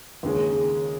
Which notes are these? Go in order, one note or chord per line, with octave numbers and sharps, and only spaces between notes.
D#2 C#3 G#3 C#4